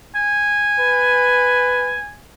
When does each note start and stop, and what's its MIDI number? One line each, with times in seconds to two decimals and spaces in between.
0.15 2.14 80
0.80 2.00 71